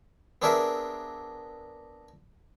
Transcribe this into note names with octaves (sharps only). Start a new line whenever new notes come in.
B3 C4 D4 G#4 A#4 E5